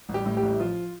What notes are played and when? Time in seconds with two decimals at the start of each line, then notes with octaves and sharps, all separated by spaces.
0.09 A1
0.14 G3 G4
0.26 A2
0.37 G3 G4
0.43 A1
0.53 E4
0.60 F3 F4